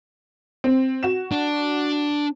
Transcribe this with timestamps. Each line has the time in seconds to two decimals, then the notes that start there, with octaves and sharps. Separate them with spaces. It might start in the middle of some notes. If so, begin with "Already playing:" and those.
0.64 C4
1.03 F#4 E7
1.32 D4